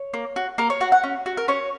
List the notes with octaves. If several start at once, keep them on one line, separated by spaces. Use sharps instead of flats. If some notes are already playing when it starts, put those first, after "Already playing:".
Already playing: C#5
A#3
F#4
A#3 A#4
C#5
F#4 F#5
F#5
C#4
F#4
A#4
C#4 C#5